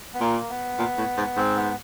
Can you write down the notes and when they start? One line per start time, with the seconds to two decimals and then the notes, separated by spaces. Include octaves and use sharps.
0.14 B3
0.20 A#2 A#3
0.49 B3
0.79 A#2
0.98 A2
1.17 G#2
1.37 G#2 C4
1.56 B3